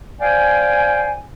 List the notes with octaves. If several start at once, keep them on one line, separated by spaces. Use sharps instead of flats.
C5 D5 F5 G5 G#5